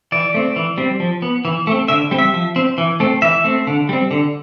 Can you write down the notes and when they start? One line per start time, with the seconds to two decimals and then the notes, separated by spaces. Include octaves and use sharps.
0.12 E3 D5
0.34 A3 C4
0.56 E3
0.78 G3 C4
1.00 F3
1.22 B3
1.45 E3
1.67 A3 C4
1.88 D3 E5
2.11 G3 C4
2.19 E5
2.34 F3
2.56 C4
2.78 E3
3.00 A3 C4
3.22 E3 E5
3.44 A3 C4
3.67 D3
3.89 G3 C4
4.11 D3